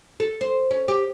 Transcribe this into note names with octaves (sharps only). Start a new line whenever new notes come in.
A4
C5
C#4
G4